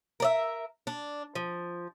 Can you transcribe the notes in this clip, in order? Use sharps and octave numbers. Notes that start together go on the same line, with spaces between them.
A#4 D5 E5
D4
F3